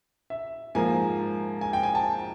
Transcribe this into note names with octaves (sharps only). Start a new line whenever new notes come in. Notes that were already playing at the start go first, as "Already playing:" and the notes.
E5
G#2 F3 A#3 G#5
G#5
G5
G#5
A5